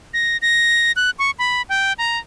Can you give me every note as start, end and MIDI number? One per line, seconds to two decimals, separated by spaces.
0.14 0.37 94
0.42 0.92 94
0.96 1.10 90
1.19 1.31 85
1.39 1.62 83
1.69 1.93 79
1.98 2.18 82